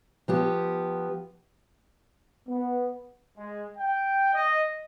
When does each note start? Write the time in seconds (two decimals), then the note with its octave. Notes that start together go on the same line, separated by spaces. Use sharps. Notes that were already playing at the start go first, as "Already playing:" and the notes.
0.28 F3 B3 G4
2.48 B3
3.37 G#3
3.77 G5
4.33 D#5